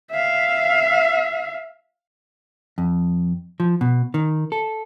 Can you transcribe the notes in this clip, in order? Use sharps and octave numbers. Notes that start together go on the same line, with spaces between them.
E5 F5
F2
F3
B2
D#3
A4